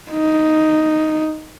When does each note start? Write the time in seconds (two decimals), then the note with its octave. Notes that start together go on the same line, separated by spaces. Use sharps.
0.11 D#4